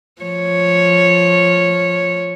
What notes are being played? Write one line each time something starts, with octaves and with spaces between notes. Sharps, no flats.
F3 C#5